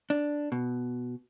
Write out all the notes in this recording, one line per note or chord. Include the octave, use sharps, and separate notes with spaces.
D4
B2